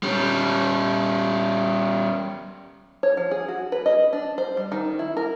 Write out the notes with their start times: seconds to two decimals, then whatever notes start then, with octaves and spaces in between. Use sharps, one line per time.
0.03 G3 C#4
3.03 C#5
3.17 F3
3.31 G#4
3.48 F#4
3.72 B4
3.86 D#5
4.13 D4
4.38 C5
4.57 G3
4.72 D#3
4.99 E4
5.17 A#4